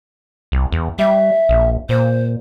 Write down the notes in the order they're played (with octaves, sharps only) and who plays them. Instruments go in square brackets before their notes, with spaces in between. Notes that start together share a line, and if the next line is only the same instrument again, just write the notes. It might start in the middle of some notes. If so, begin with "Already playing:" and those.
[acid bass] C2
E2
[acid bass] G3 [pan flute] E5
[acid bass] A#1
[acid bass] A#2 [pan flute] C5